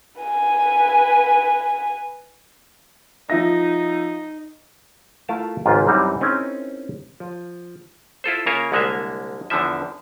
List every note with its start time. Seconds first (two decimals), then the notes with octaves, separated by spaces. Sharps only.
0.21 B4 G#5
3.30 F3 D#4 E5 A#6
5.29 A3 E4 F4 A#4 F5 A5
5.66 G#1 C#2 G#2 F4
5.87 F#2 E3 G3 C4 D4 D#4
6.21 C4 C#4 D#4 E4 G#4 A#4
7.20 F3
8.24 E4 F4 A4 C5
8.46 C#3 A#3 F4 A#4 C#5 E5
8.72 C2 D3 G#3 A#3 C#5 E5
9.50 E2 D3 E3 F3 E5